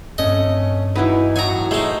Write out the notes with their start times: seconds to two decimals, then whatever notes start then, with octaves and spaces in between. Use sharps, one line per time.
0.18 G2 A3 C4 C#4 D#5
0.95 E3 D#4 E4 F#4 B4
1.36 A2 F#3 F#4 G#5 A#5
1.71 G#3 A3 D#4 C5